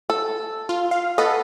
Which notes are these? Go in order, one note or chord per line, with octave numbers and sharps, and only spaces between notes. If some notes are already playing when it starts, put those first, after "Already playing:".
A4
F4
F5
B3 A4 D#5